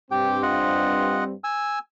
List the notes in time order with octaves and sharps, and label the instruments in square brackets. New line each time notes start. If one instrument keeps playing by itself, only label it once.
[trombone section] G2 C4 [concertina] G4 G5
[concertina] F4 D#5 F#5
G#5 E6